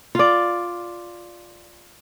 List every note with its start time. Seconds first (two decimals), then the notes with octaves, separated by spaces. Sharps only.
0.15 F4 D5